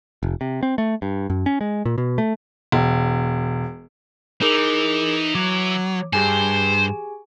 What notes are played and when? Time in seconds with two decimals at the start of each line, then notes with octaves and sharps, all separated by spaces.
0.23 F1
0.41 C3
0.63 C4
0.78 A3
1.02 G2
1.30 F#2
1.46 C#4
1.61 G#3
1.85 A#2
1.98 B2
2.18 A3
2.72 E1
4.42 E3 D#4 G#4 A#4 D6
5.35 F#3 D6
6.13 G2 G4 G#4 C5 G#5